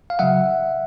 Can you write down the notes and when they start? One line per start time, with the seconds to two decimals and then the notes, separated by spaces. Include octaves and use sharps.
0.10 F5
0.19 C#3 F#3 E5 F#5